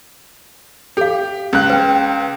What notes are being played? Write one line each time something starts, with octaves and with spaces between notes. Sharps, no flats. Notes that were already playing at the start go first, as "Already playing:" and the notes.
G4 A4 F5
C#2 F#6
B4 G5